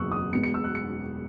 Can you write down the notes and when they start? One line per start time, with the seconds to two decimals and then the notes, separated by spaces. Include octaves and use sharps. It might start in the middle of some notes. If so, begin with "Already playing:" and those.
Already playing: F#1 E2 B2 C#6 D#6 E6 F#6
0.12 D#6
0.33 E1 E2 B2 C#7
0.43 C#7
0.54 E6
0.64 F#6
0.75 C#7